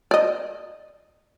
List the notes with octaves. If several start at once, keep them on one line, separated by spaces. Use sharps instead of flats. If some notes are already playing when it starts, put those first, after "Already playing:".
D5 D#5